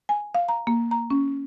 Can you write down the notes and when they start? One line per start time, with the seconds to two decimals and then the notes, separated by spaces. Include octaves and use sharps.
0.09 G#5
0.35 F5
0.49 A#5
0.67 A#3
0.91 A#5
1.10 C#4